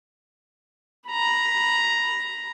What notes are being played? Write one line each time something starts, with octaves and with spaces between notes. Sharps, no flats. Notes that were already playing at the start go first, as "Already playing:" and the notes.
A#5 B5